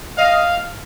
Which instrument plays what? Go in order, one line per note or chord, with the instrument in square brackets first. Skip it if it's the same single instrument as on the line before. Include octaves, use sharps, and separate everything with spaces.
[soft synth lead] D#5 [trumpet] F5